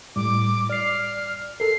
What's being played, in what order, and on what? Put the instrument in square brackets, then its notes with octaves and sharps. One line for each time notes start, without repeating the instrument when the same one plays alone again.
[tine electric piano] A2 G3 [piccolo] D6
[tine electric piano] D5 C7 [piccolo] F6
[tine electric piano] A4 A#4 [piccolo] C7